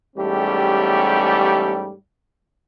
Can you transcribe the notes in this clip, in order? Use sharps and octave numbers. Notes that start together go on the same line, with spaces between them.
E2 G#2 G3 A3 C#4 G4